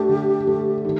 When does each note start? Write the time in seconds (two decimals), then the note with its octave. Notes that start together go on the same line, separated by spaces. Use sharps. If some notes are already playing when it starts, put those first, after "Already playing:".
Already playing: A3 D4 G4
0.09 D3
0.47 A3
0.85 D#3